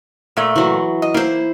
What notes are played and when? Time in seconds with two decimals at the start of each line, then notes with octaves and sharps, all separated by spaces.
0.37 A#2 A3
0.56 E3 F#3
1.02 D#5
1.14 A#3 E4 C5